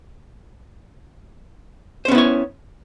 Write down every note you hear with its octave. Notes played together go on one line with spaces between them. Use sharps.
B3 C#4 E4 C5 C#5